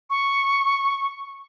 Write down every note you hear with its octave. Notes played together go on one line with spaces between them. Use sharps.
C#6